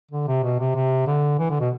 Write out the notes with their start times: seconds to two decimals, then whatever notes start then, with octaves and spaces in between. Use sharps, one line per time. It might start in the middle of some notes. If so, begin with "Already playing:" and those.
0.11 D3
0.27 C3
0.44 B2
0.59 C3
0.75 C3
1.07 D3
1.39 E3
1.50 D3
1.60 B2